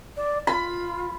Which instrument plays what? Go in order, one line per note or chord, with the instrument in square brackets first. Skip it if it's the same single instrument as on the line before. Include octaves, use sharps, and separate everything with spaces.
[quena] D5
[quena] F4 [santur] B5